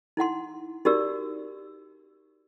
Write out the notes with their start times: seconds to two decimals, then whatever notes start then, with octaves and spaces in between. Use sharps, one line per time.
0.17 D#4 E4 F#5 C6
0.85 D#4 F#4 G4 A#4 D5 E6